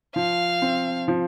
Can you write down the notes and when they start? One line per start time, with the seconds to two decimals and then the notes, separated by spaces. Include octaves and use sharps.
0.16 F3 F5
0.62 C4
1.08 F3